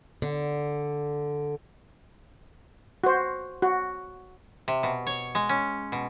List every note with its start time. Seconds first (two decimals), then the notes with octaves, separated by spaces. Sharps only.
0.22 D3
3.04 F#4 C5
3.62 F#4
4.68 C3
4.83 B2
5.07 C#5
5.35 G#3
5.49 C#4
5.92 B2